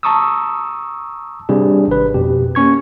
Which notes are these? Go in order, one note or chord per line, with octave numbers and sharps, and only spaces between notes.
A5 A#5 C#6 D#6 E6
C3 G3 D4 G#4
G#1 B4
F2 B2 G4
A#3 C#4 C#6 G#6